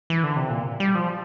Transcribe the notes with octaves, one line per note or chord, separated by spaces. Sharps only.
E3
D3
C3
A#2
G3
F3